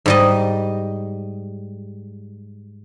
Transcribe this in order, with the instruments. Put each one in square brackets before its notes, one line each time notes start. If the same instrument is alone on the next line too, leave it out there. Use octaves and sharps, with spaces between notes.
[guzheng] G#2 G3 D#5